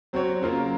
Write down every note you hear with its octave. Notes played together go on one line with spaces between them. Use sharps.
F#3 C4 F#4 C#5
C#3 F#3 A#3 F4 A#4